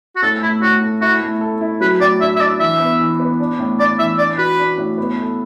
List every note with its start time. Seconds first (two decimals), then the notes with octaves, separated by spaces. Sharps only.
0.16 F#4
0.22 A2 A4
0.42 A3 E4
0.62 A2 F#4
0.81 A4
1.01 E4 F#4
1.21 A3
1.41 A4
1.61 E4
1.81 F#3 B4
2.00 A2 D5
2.20 D4 E5
2.36 E5
2.40 D4 D5
2.60 E3 E5
2.80 B3
3.00 E3
3.20 B3
3.40 D4
3.59 A2
3.79 D4 D5
3.99 E3 E5
4.18 D4 D5
4.38 F#4 B4
4.58 D4
4.78 A2
4.98 B3
5.18 A4